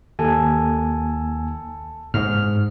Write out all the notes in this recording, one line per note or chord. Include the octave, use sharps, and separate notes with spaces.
D#2 A4 G#5
G#2 F6